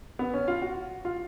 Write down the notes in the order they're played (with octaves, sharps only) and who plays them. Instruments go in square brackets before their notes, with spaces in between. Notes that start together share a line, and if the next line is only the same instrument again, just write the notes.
[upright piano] B3
C#4
F4
F#4
F4